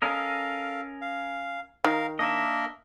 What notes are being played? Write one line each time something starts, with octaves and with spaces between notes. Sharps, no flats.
C#4 A4 A#4 D#5 F5
F5
D#3 A#4 F5
A#3 D4 A#4 D#5 E5